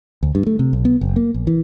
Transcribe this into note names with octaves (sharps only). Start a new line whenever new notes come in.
D2
G2
A3
C3
B1
B3
F#1
A#3
A#1
E3